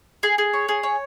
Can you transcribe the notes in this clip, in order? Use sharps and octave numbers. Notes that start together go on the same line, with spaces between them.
G#4
G#4
C#5
G#4
C#5